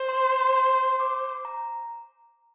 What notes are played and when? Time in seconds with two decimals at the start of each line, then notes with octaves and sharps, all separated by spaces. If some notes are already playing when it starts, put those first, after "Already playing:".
Already playing: C5
0.09 C6
0.54 C6
1.00 D6
1.45 A#5